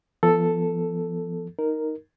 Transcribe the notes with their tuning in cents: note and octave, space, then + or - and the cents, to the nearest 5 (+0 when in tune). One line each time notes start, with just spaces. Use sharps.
F3 -35 B3 +0 A4 +0
D#4 +0 A#4 +0